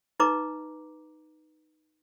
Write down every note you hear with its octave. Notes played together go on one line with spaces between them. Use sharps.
D#4 B4 D#5 A#5 D6